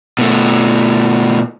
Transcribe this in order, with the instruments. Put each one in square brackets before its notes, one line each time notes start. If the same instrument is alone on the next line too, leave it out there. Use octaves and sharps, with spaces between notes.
[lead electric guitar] B2 A3